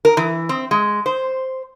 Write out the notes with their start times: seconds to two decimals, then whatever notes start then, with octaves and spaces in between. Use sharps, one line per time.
0.05 A#4
0.17 E3
0.49 C4
0.71 G#3
1.06 C5